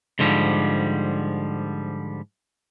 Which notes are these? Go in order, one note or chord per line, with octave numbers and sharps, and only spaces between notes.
G#2 D3 F3 G3